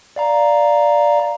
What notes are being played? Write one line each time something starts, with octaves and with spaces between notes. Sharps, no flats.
D5 F5 A#5